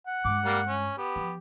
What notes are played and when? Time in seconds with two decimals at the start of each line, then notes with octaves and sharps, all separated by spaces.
0.07 F#5
0.25 G2 G#3 D6
0.45 G3 A#3
0.67 C#4
0.98 B3 G4
1.16 F3